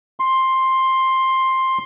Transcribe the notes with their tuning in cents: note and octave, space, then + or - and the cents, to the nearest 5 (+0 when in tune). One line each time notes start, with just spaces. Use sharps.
C6 +10